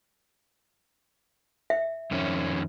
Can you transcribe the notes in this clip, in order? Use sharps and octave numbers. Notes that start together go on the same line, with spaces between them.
E5
F2 D#3 C#4